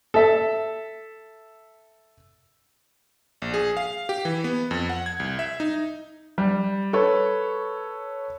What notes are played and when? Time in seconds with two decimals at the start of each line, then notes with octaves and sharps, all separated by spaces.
0.14 A4 E5
3.42 A#1
3.54 G#4
3.77 F5
4.09 G4
4.25 E3
4.44 B3
4.71 F2
4.89 F#5
5.06 G#6
5.20 C2
5.39 E5
5.60 D#4
6.38 G3
6.93 A4 B4 C#5